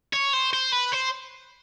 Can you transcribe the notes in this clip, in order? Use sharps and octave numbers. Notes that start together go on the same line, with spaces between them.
C#5
C5
C5
B4
C5